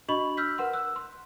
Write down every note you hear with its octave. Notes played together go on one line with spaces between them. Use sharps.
D4 F#4 D#5 B5 C#6 F#7
E6 F6 G6 B6
A#4 B4 F#5 C6
E6 F#6
C6